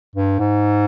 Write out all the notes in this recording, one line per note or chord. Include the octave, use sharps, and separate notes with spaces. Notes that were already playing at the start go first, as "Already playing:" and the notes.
G2
G#2